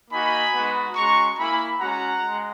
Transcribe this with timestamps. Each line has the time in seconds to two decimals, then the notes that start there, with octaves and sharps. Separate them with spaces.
0.11 A#3 D#4 F#4 G#5 B5
0.53 G#3 B3 D#4 F#4
0.96 G#3 C#4 F#4 A#5 C#6
1.38 A#3 E4 G#5 B5
1.80 G#3 C#4 F#4 F#5 A#5
2.23 G#3